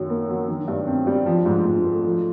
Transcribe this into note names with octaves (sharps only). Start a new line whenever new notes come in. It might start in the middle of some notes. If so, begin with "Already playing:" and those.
Already playing: F#2 D#3
A#3
F#3
D#3
G2
C4
G3
F3
G#2
G#2
A3
F3